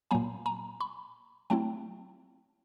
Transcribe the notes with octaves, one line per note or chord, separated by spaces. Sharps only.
A#2 F#3 A#3 G#5 A#5
G#5 A#5
B5 C#6
F#3 A3 C4 E4 G5 A5